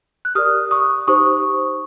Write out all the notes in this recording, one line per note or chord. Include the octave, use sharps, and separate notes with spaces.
F#6
G4 A#4 D5 D#6 F6
C#6 D#6
D#4 G4 C5 C#6 D#6